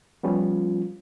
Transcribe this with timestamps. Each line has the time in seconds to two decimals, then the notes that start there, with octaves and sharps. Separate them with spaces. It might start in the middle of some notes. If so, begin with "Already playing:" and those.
0.23 F3 G3 B3 C#4 F4